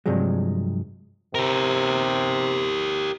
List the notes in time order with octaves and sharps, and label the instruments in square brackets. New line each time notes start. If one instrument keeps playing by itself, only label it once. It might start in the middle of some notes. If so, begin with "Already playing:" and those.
[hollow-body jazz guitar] G2 C3 F3 F#3 G#3
[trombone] C3 [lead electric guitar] G4 A#4